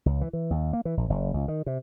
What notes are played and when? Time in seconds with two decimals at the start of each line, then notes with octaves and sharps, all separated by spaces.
0.06 C#2
0.21 E3
0.33 E3
0.50 D#2
0.73 A#3
0.85 E3
0.97 A#1
1.10 F#1
1.34 C#2
1.48 D#3
1.66 C3